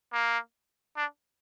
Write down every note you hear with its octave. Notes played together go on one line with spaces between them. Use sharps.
A#3
D4